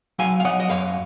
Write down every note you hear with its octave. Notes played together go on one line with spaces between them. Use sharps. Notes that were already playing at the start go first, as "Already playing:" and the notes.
F#3 F5 G#5
F5
F#3 D#5 F#5
D#5
F#2 C#5 F5